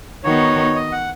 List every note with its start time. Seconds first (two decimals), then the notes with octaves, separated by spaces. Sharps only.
0.24 D#3 B3 D#4 F#4 C#5
0.75 D#5
0.92 F#5